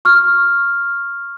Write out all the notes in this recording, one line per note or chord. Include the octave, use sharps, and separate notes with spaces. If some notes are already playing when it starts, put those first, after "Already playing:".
C#6 F6